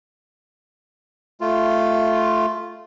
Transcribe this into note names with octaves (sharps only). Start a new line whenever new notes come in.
A3 F4